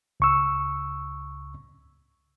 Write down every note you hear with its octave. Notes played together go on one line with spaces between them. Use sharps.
C#2 C#6 E6